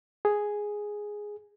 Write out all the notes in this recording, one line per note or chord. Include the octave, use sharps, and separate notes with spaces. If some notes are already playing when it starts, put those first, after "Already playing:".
G#4